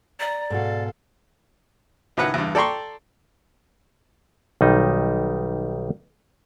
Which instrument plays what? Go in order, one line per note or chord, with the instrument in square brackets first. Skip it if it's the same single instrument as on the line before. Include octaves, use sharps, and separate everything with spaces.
[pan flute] D5 [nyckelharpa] A#5
[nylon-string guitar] G#2 B2 F#4 [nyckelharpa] A4 F5
[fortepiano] C#2 A2 D#3 B4 F#5
E2 G2
A4 D5 G5 A#5 C6 C#6
[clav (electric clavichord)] B1 D#3 G3 D#4